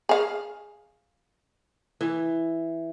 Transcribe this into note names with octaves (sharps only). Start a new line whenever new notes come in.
G#4 F5
E3